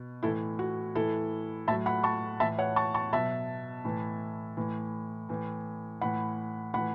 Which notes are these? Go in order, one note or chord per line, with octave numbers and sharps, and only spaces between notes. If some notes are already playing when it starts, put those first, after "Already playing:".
Already playing: B2
A2 E3 E4 A4
F#4
A2 E3 E4 A4
A2 F#3 E5 A5
F#5 B5
A5 C#6
A2 E3 E5 A5
C#5 F#5
A5 C#6
A5 C#6
B2 F#3 E5 A5
A2 E3
A2 E3
A2 E3
A2 E3 F#5 B5
A2 E3 F#5 B5